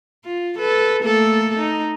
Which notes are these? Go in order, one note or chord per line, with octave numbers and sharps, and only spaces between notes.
F4
A4 B4
A3 A#3 A4
D#4